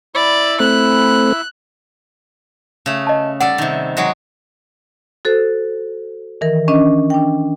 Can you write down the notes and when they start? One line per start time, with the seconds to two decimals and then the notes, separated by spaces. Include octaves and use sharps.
0.15 E4 D5 B5 E6
0.60 A3 C4 F#6
2.86 C#3 A3
3.07 D#5 A5
3.40 G3 A4 D5 F#5
3.58 C3 D#3
3.97 F#3 G#3 F#4
5.25 F#4 A4 C5
6.41 D#3 E3 A#4
6.68 C#4 D4 D#5
7.10 D4 G5